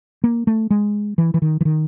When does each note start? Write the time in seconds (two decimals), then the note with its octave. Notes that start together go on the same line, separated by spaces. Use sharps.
0.24 A#3
0.47 A3
0.70 G#3
1.18 E3
1.34 E3
1.42 D#3
1.61 E3
1.65 D#3